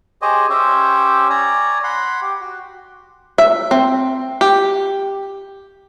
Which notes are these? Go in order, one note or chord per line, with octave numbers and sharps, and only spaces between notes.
G4 G#4 C5 C#5 D#5
C#4 G4 C5 C#5 E5
C#5 D5 G#5 A#5
F#5 B5 C6
G4
F#4
E5
C4
G4